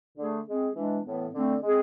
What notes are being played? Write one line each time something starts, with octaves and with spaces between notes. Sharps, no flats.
D3 A3 D4 G#4
G#3 C4 G#4
E3 G#3 D4
A2 E3 B3
D3 A3 C4
G#3 C4 G#4